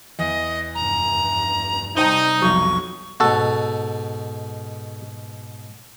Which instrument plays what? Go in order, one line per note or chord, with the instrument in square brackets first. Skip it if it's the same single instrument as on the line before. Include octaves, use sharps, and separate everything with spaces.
[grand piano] E2 [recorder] D#5
[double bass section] F1 G2 [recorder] A#5
[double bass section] C3 G3 [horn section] D#4 [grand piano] C5 G5 A5
[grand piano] B1 F2 F#3 [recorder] C#6
[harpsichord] G#2 B2 [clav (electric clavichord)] F#4 A4